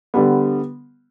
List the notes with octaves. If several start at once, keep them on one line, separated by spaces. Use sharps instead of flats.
D3 G3 B3